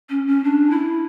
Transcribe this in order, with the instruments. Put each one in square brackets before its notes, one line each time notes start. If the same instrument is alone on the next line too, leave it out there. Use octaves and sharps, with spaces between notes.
[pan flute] C#4
C#4
D4
E4